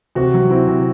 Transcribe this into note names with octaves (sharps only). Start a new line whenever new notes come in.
C3 F#4
F#3
C4 E4
C3